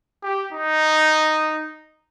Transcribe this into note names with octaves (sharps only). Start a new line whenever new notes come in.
G4
D#4